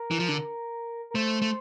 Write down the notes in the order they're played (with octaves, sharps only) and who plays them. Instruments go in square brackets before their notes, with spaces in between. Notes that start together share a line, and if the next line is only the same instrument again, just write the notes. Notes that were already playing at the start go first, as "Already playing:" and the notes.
Already playing: [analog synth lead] A#4
[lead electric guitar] E3
F3
D3
[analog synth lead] A#4
[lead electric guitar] A3 [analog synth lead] C5
[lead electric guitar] A3